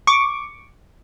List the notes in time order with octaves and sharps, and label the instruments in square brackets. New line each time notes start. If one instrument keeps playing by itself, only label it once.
[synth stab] C#6 D6